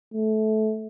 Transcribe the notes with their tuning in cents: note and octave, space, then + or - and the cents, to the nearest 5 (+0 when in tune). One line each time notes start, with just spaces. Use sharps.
A3 -20